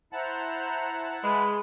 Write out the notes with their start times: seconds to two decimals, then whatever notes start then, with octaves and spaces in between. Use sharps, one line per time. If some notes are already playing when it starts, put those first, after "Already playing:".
0.13 E4 C5 F#5 A5 A#5
1.24 G#3 B4